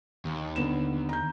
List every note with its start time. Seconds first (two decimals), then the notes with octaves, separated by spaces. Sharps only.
0.25 D#2
0.56 D3 B3 E7
1.09 A#5 G6